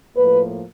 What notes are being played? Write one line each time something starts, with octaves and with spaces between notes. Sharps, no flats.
A2 F3 A#3 B4